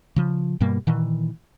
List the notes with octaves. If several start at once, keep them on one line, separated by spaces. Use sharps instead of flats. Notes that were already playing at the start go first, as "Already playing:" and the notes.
C#3 F3
G2 B2 G3 A#3
A#2 D#3 E3